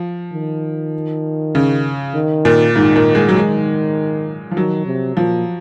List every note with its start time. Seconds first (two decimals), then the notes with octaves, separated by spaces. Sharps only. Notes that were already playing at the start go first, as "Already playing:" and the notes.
Already playing: F3
0.33 D#3
1.55 C#3
2.14 D#3
2.45 A#2
2.75 G#2 D#3
2.96 A#2
3.15 G#3
3.29 F#3
3.36 D#3 G#3
4.51 F3
4.57 D#3 F#3
4.86 C3
5.16 A#2 F3